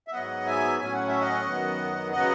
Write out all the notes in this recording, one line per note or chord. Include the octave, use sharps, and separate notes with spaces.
E5
G#2 F#3 B3 D#5 F#5
E5 G#5
A2 F#3 C#4 G#5
F#5
E5
D#5 F#5
F#2 D#3 F#3 B3
C#3 F#3 B3 D#5 F#5